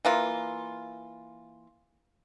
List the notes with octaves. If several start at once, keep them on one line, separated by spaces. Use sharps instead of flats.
E3 A#3 F4